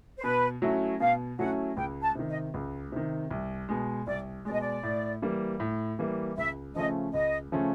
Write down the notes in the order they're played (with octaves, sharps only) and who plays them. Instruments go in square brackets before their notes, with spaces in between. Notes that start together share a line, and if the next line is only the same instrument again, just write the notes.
[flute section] C5
[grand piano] B2 [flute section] B4
[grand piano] F#3 A3 C#4 E4
[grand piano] B2 [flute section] F5
[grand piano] F#3 A3 C#4 E4 [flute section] F#5
[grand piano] C#2 [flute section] G5
[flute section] A5
[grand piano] C3 D#3
[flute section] D#5
[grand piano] C#2
C3 D#3
C2
B2 G#3
[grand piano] C2 [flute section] D5
[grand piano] G#3 [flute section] D5
[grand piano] B2 [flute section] D#5
[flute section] D5
[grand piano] A2
E3 G3 A#3
A2
E3 G3 A#3
[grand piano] C#2 [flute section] E5
[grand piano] C#3 F3 A3 C#4 [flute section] D#5
[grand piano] C#2 [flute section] D#5
[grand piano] C#3 F3 A3 C#4